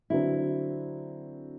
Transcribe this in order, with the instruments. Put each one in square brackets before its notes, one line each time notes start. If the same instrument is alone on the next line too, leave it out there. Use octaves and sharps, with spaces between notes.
[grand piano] D3 F#3 C4 [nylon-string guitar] E4